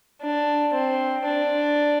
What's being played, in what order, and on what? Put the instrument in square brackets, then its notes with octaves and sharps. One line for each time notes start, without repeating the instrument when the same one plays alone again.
[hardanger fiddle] D4
C4
D4